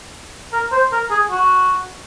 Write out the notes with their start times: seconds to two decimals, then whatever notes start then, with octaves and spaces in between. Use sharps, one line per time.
0.53 A#4
0.72 C5
0.92 A#4
1.11 G#4
1.31 F#4